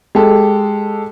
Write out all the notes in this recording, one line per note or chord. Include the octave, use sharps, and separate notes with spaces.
G#3 G4 A4